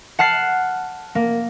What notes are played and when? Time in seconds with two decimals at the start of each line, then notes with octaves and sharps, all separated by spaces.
0.19 F#5 A5 F6 C7
1.15 A#3